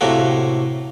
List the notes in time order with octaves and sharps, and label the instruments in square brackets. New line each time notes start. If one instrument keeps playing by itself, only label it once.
[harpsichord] A2 C3 A3 A#3 F#4